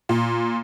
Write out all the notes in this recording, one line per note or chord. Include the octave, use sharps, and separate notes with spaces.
A#2